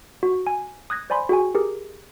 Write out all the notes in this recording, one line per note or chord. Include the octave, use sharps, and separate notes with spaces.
F#4
G#5
D#6 F#6 G#6 A#6
C5 D5 G#5 B5 C6
F#4 G#4 G5 G#5
G4 G#4 A#4